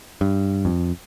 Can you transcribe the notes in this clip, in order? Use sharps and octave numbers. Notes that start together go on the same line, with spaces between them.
G2
F2